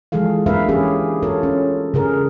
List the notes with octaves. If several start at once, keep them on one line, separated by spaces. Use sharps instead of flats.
E3 F3 G#3 G#4 A4 F5
A#3 D4 A#4 B4 E5 F5
E3 G#3 C#4 G4 G#4
F4 A4 A#4 C#5
C#4
C#3 G#4 A#4